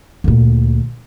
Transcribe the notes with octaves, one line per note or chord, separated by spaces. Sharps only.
D2 A#2